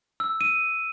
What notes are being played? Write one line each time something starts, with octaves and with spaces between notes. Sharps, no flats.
E6
D#7